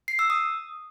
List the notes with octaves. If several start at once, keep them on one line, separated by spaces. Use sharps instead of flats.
C7
E6
D#6